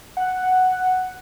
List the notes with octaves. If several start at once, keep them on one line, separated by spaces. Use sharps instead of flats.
F#5